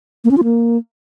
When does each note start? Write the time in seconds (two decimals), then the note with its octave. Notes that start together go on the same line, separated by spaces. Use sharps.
0.25 A#3
0.31 C#4
0.37 F4
0.44 A#3